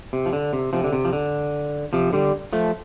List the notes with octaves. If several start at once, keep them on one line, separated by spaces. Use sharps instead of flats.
C3
F3
D3
C3
C3 F3
D3
C3
F3
D3
C3 F3
D3 G3
F3 A3